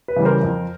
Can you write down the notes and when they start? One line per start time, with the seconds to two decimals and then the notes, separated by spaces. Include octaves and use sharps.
0.08 B4
0.16 C#3 E3 G3
0.25 A#4 C5
0.43 F2